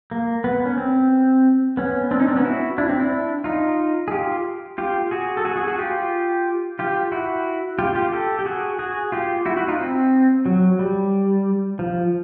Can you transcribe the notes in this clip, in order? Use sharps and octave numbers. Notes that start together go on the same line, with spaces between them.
A#3
B3
C#4
C4
B3 C#4
C4 D4
C#4 D#4
C4 D4
B3 C#4
E4 F#4
D4 E4
C4
D4 E4
D#4 F4
G#4
F4 G4
F4 G4
F#4 G#4
A4
F#4 G#4
F#4 G#4
F#4 G#4
F4 G4
F4 G4
E4 F#4
F4 G4
F4 G4
G4 A4
G4
F#4 G#4
F#4 G#4
F4 G4
E4 F#4
E4 F#4
D#4 F4
C4
F#3
G3
F3